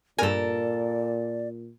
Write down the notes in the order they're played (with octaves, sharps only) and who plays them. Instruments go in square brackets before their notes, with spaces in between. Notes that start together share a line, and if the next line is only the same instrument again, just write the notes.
[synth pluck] G2 G#5 [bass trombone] A#2 [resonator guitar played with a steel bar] A4 A#4 [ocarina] D5